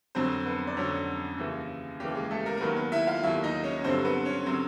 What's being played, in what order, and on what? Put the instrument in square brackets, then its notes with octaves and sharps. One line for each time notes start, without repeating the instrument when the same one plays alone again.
[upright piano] F2 D3 F#3 C4 C5
B3 B4
D5
F2 D3 F#3 C#4 C#5
D#2 C#3 E3
D#2 C#3 E3 G3 G4
G#3 G#4
A3 A4
A#3 A#4
A#4
D#2 D#3 F#3 B3 B4
B3 B4
E4 E5
F4 F5
D#2 D#3 F#3 E4 E5
D#4 D#5
C#4 C#5
G2 D3 F#3 C4 C5
B3 B4
C#4 C#5
D3 F#3 C4 C5